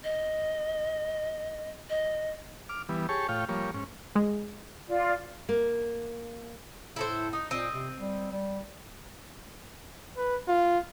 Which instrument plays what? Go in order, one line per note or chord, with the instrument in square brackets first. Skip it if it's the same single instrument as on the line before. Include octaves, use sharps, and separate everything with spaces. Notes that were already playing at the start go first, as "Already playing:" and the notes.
[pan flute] D#5
D#5
[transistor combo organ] D6 F6
E3 G3 B3
G4 G#4 C#5 A5 C#6
A2 F4 C#5 F5 G5
F3 G3 A#3 C#5
G#2 C#4
[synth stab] G#3
[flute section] F4 D5
[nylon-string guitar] A#3
[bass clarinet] A2 [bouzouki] E4 A4 C5
[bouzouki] D#4
[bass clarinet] A#2 [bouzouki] C4 D#5
[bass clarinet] C3
G3
G3
[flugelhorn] B4
F4